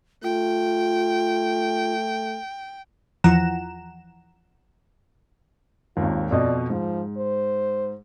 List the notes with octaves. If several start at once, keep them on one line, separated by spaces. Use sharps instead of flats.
A3 F4 G5
E2 E3 F3 F#5 A#5 E7
G#1 D#2 F4
F2 B2 D5 D#5
G#2 F3
C5